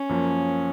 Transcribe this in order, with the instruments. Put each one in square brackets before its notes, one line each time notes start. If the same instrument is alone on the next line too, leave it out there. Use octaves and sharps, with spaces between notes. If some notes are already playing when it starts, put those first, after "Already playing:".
Already playing: [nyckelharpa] C#4
[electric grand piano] F#2 F3 A#3